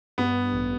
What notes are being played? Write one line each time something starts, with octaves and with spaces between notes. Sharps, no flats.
G2 B3
G2
A1